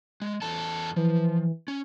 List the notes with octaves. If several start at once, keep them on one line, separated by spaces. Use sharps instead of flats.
G#3
E2 A4 A5
E3 F3
C#4